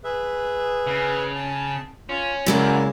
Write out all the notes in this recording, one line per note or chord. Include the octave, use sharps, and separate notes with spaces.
G#4 B4 E5
C#3
A5
C#4 F4
F#2 C#3 G#3 A#3 E4 D5 C6